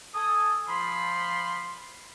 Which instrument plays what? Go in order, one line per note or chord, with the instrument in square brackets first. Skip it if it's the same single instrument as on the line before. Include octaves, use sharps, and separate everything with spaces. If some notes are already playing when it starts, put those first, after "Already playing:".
[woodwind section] A4 G#5 D#6
F3 B5 C6